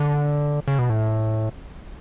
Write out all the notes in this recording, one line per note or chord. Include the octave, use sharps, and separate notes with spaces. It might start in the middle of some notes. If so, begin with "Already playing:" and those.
Already playing: D3
C#3
B2
A2